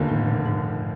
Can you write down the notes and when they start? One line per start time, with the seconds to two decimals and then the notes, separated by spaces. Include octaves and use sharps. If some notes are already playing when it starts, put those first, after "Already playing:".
Already playing: F1 D#2 D3 F3 A#3
0.09 A2
0.27 A#2
0.45 G#2